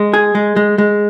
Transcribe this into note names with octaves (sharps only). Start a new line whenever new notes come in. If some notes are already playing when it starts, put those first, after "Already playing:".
Already playing: G#3
G#4
G#3
G#3
G#3